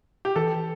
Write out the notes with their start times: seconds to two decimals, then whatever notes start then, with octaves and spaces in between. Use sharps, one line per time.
0.25 G4
0.36 E3 A4